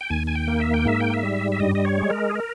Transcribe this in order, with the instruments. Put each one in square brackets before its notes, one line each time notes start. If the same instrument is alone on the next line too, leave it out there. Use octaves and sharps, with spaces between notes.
[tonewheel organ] G5
D#2 G#5
G#5
G5
A#3
E5
G5
G#2 E5
G5
E5
G3
E5
G2 D#5
D#5
C#5
G#3
A#4
G#4
A#4